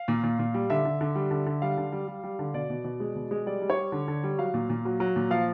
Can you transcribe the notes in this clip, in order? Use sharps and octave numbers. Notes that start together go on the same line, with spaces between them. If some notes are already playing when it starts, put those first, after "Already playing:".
Already playing: F5
A#2
A#2
A#2
G3
D3 E5
D3
D3
G3
D3
D3
G3 F5
D3
G3
G3
G3
D3
B2 D5
B2
B2
G#3
B2
G#3
G3 D5
G3
C#5
G3
D3
D3
G3
F#3 F5
A#2
A#2
F#3
F#3
A#2
F3 F5